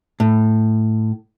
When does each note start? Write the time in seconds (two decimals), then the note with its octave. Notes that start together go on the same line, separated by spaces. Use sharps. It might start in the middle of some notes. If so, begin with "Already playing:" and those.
0.20 A2